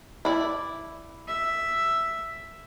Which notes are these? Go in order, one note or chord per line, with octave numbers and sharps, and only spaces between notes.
E4 D5
E5